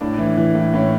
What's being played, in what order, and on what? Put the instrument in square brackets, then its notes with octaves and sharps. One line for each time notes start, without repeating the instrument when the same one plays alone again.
[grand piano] A2 D4
E3
E3
A2
A2 C#4